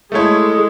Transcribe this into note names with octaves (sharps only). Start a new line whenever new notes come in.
G#3 A3 E4 A4 C#5